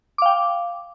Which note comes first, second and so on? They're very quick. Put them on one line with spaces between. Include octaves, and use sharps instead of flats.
D6 F5 G5